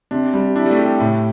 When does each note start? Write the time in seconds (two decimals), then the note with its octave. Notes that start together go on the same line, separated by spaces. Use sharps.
0.11 C3 D4
0.33 G3
0.56 D4 E4
0.66 G3
0.71 A3
0.79 G4
0.86 G3
1.00 A2 A3